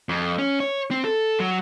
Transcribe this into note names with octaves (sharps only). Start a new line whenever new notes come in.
F2
C#4
C#5
C4
A4
F#3